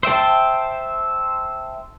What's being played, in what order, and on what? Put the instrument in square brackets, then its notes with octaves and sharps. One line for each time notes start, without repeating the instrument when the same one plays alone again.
[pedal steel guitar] C5 E5 G5 A5